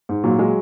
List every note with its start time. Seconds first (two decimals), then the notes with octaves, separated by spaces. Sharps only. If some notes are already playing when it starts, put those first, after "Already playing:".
0.09 G#2
0.24 A#2 F#3
0.39 G#3